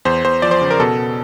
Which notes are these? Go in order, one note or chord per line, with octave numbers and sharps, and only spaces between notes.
E2 C5
E2 C5
F3 D5
C5
C#3
A#4
B2 A4
B2